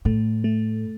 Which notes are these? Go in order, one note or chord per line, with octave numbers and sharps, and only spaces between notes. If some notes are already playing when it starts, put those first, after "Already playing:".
A2 A3
A3